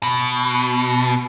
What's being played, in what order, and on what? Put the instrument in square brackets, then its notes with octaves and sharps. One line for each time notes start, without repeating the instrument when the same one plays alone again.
[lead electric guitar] B2